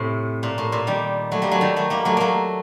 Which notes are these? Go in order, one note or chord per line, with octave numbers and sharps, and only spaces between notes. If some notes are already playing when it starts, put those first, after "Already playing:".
Already playing: A2 C3
A#2
A2
A#2
D#3 G3
F#3 A3
G3 A#3
F#3 A3
D#3 G3
F#3 A3
G3 A#3
F#3 A3
F#3 A3 A#3